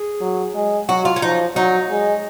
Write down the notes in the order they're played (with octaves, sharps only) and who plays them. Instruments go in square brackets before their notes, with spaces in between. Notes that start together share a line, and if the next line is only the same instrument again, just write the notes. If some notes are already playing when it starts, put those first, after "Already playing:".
Already playing: [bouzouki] G#4
[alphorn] F#3
G#3
[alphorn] F#3 [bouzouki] F#4
[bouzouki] F4
C#4
[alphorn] F3 [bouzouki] D#4
[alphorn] F#3 [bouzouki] D#4
[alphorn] G#3